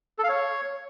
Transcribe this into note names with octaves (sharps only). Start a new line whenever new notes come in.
A4
F5
C#5